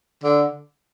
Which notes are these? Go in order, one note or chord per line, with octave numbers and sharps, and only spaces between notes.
D3